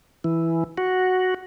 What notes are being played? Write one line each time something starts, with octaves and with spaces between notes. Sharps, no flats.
E3
F#4